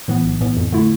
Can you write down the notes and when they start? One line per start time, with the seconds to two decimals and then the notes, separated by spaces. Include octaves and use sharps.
0.08 A2 E3 B3
0.24 B1
0.41 A2 E3 B3
0.57 F2
0.72 D3 A3 E4